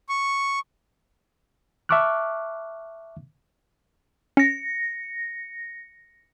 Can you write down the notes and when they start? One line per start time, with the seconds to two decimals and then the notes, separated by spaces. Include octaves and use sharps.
0.09 C#6
1.89 E5 A5 C#6 D6 F6 F#6
4.37 C#4 A#6 C#7